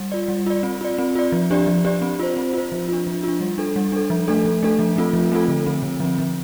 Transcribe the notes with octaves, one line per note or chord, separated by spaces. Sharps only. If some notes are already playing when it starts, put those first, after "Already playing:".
Already playing: G3
F4 D5
G3
F4 D5
C4
F4 D5
C4
F4 D5
F3
D4 G4 D5
F3
D4 G4 D5
C4
F4 C5
C4
F4 C5
F3
D4 F4
F3
D4 F4
G3
D4 A4
G3
D4 A4
F3
A3 D4 A4
F3
A3 D4 A4
F3
A3 C4 F4 A4
F3
A3 C4 F4 A4
D3
F3 C4
D3
F3 C4
F3